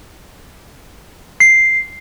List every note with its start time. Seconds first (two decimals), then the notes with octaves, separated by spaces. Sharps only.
1.40 C7